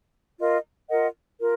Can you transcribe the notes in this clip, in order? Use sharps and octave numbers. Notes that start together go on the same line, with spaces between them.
F4 A#4 D#5
F4 A#4 D#5 F#5
F4 A#4